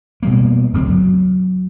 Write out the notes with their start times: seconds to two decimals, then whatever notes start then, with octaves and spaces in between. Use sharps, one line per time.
0.23 B2 G3 A#3
0.73 F#1 D2 C4
0.90 F#3